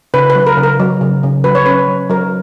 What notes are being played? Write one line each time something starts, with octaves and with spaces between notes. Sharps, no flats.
C#3 B4
B4
F#3
A#4
C#3
A#4
F#3
C#3
C#3
F#3 B4
C#5
C#4 B4
F#3
F#3 A#4